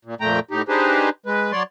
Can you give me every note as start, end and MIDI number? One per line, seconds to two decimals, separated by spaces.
0.05 0.15 46
0.21 0.40 41
0.21 0.40 46
0.21 0.40 57
0.21 0.40 79
0.21 0.40 82
0.51 0.62 45
0.51 0.62 63
0.51 0.62 67
0.68 1.09 62
0.68 1.09 63
0.68 1.09 67
0.68 1.09 68
0.68 1.09 71
0.68 1.09 72
1.26 1.52 56
1.26 1.52 71
1.52 1.63 54
1.52 1.63 73
1.52 1.63 74
1.52 1.63 84